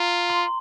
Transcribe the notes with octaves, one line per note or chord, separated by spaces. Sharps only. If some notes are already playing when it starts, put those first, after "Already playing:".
Already playing: F4 A#5
C6